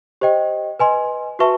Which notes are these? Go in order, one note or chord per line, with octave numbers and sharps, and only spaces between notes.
G4 C5 D#5 G5
B4 D#5 G#5 C6
F#4 B4 E5 A5 C#6